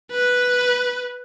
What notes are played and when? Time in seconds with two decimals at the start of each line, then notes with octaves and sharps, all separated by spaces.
0.12 B4